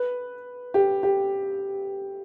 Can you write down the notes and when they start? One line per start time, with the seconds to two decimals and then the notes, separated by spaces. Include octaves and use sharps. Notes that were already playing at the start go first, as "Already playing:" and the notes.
Already playing: B4
0.74 G4
1.03 G4